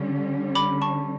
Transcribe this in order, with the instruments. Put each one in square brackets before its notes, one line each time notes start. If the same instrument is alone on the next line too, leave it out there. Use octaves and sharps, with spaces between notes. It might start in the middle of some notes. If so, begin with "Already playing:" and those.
Already playing: [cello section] D3 G3 C#4
[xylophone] B5 D6
A5 C#6